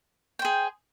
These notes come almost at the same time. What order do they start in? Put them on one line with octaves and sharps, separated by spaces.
G5 C5 G#4